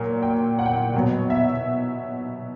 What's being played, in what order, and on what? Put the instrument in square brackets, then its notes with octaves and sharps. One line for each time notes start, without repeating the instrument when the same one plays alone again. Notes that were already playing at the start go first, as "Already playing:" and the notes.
Already playing: [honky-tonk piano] A#2 F#3 A#3
G5
F#5
G5
F#5
B2 F#3 B3
E5